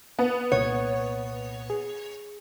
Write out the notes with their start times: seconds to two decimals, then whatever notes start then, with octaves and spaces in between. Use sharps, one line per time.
0.19 B3
0.52 C2 A#2 C#5 F#5
1.70 G#4